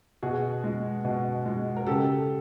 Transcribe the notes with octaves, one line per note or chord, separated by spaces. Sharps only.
B2 F#4 G#4
G#3
B2
G#3
A#4
C#3 G4 A4